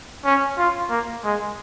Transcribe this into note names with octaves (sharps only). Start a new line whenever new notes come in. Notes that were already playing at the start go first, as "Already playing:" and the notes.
C#4
F4
A#3
G#3